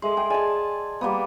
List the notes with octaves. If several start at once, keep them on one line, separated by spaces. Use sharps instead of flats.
G#3 A4 E5 C6
G5 G#5
D5 D#5 G#5 A5 C6
G3 A#3 B3